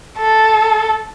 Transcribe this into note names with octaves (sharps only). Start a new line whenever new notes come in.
A4